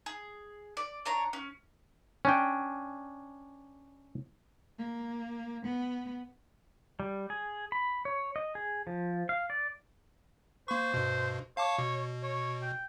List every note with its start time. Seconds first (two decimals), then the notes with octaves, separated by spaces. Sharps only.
0.06 G#4
0.77 D5
1.05 D4 C#5 A#5
1.33 C#4
2.25 C#4 D4 G5
4.79 A#3
5.66 B3
7.00 G3
7.30 G#4
7.72 B5
8.05 C#5
8.36 D#5
8.55 G#4
8.87 F3
9.29 F5
9.50 D5
10.68 A#3 C5 C#6
10.94 G2 B2
11.57 C#5 F5 A5 D6
11.78 B2
12.23 C#5
12.62 G5